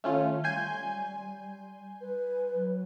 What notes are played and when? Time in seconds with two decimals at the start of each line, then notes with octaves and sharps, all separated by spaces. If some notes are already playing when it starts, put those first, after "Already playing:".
0.04 D#3 A3 C#4 F4
0.44 G3 G#5 C6 G6
2.01 B4
2.54 F#3